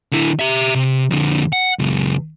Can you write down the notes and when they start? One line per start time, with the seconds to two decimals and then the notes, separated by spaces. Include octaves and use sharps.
0.12 D3 E4
0.39 G4 E5
0.75 C3
1.10 F2 D3
1.53 F#5
1.79 C#2 F#2